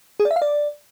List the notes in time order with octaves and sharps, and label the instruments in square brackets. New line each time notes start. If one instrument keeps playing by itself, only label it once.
[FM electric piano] G#4
D5
E5
F5
D5